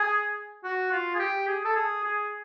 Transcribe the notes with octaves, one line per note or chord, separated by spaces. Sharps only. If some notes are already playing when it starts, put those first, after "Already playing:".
Already playing: G#4
F#4
F4
G#4
G4
G#4
A4
G#4
G#4